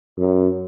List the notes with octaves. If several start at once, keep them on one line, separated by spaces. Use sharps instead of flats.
F#2